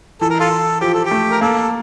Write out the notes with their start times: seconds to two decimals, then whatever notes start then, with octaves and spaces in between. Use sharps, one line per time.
0.21 E3 A4
0.30 A#4
0.40 F4 A4
0.81 F3 G4
0.94 A4
1.05 G4
1.11 A3
1.31 A#4
1.41 A#3 A4